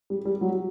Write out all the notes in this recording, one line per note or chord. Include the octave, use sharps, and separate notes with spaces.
G3
G3
F#3